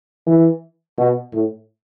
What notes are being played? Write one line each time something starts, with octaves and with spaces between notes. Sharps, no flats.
E3
B2
A2